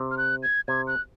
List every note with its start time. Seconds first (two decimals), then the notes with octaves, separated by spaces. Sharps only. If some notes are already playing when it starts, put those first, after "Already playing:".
Already playing: C3
0.11 F6
0.17 F#6
0.43 G#6
0.68 C3 G#6
0.87 F#6